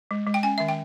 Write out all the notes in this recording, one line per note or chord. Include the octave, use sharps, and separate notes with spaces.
G#3
G#3
G5
C#4 G#5
D#3 E5
G5